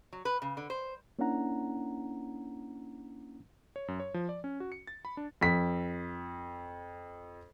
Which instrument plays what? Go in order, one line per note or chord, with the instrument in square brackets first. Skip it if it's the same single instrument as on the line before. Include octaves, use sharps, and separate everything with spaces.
[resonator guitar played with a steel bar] F#3
B4
C#3
D3
C5
[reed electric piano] A#3 C#4 D4 E4 F#5 A#5
[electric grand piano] C#5
F#2
C#5
F3
D5
C#4
F#4
C#7
A6
B5
D4
[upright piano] F2 B6